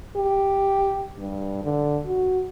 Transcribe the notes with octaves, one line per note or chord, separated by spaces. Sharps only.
G4
G2
D3
F#4